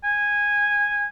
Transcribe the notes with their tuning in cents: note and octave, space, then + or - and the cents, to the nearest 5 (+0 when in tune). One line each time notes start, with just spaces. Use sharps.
G#5 -10